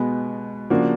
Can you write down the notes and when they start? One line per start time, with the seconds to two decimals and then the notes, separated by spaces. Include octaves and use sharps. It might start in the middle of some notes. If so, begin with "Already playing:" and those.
Already playing: B2 G#3 B3
0.70 C#3 F3 A#3 D4 F#4